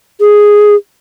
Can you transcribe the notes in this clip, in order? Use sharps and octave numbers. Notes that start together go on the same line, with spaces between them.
G#4